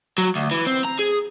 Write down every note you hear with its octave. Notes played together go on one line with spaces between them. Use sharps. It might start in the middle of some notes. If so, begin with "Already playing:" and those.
F#3
D2
E3
C4
A#5
G#4